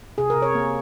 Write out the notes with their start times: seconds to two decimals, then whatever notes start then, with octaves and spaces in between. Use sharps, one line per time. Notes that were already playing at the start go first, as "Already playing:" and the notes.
0.18 C3 G#4
0.30 A#4
0.36 C3
0.42 C#5
0.55 A#3